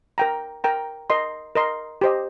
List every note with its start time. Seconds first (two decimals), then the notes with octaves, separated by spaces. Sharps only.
0.18 A#4 G5 A#5
0.64 A#4 G5 A#5
1.10 A#4 D#5 C6
1.55 A#4 D#5 C6
2.01 G4 C5 D#5